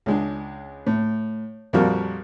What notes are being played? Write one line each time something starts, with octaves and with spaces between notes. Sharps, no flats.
C#2 G#3 D4
A2
F2 A#2 F3 G3 F#4 A#4